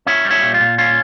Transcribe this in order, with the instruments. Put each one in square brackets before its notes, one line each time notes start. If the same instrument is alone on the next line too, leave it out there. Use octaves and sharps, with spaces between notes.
[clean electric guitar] C#4 C#5 E5
G3
C#5 E5
A#2
F4
A#2
C#4 F4